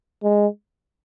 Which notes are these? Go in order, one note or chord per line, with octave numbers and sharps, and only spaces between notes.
G#3